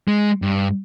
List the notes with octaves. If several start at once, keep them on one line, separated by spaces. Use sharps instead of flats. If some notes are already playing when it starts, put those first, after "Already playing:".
G#3
G2